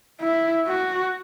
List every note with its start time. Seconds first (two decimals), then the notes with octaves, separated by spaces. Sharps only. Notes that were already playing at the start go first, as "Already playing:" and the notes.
0.20 E4
0.67 F#4